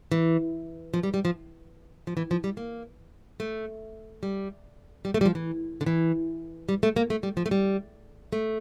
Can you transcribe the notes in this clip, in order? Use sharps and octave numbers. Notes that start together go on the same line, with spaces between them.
E3
F3
G3
G3
F3
F3
E3
F3
G3
A#3
A3
G3
G3
A3
G3
F3
E3
D3
E3
G3
A3
A#3
A3
G3
F3
A3
G3
A3